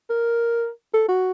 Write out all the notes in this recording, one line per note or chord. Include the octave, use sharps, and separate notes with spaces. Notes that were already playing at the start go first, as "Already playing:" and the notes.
A#4
A4
F#4